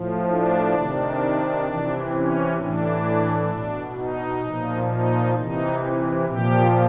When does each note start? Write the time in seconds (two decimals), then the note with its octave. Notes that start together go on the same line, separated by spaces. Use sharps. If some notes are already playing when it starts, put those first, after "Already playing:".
Already playing: A2 F3
0.29 D4
0.75 C3 D#3
1.67 C3 E3
2.12 C#4
2.59 A2 E3 D4
3.51 B2
3.97 D#4
4.42 A#2 F3
4.89 D#4
5.34 C3 E3 D#4
6.26 A#2 F3 G4